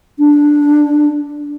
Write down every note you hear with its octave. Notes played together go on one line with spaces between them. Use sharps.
D4